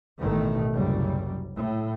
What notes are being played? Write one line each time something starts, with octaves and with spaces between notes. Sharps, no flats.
A1 B2 D#3 A3
F#1 C2 F#2 G3
A2